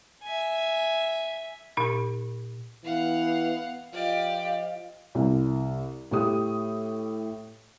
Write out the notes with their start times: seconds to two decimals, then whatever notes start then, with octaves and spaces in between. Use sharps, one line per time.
0.23 E5 G#5
1.77 A#2 D#4 A#4
2.84 E3 B3 F5 F#5
3.93 F3 F4 G4 D5 D#5 F5
5.15 C2
6.11 A2 G4 D#6